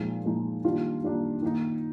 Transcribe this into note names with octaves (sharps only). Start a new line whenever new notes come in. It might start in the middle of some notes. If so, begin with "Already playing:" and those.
Already playing: A#2 F3 G#3 D#4
A#2 F3 G#3 D#4
D#3 G3 A#3 D4 F4
D#3 G3 A#3 D4 F4
D#3 A#3 D#4